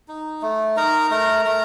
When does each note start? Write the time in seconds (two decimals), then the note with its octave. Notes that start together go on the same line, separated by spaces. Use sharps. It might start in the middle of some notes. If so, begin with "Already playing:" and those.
0.08 D#4
0.42 A3
0.76 D#4 A#4 A#5
1.11 A3 A#4 A#5
1.45 A3 A#4 A#5